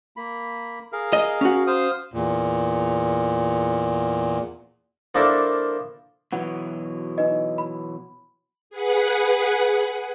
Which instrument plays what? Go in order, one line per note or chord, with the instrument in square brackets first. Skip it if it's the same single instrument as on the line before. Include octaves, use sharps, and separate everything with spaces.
[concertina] A#3 B5
G#4 A#4 F5
[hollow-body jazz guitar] D#5
C#4 F#4
[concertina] C5 F5 D#6
[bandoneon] E2 A#2
[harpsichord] F3 A#3 D4 E4 A4 A#4
[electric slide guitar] B2 E3 F#3 [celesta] F#5
[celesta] D#4 B4 D#5
B5
[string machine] G#4 B4 F#5